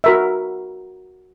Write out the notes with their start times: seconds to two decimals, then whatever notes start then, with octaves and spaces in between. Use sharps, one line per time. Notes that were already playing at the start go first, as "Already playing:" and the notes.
0.04 F#4 A#4 E5